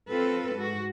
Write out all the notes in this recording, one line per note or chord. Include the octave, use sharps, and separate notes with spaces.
C4 F4 A4 B4
G#2 F#4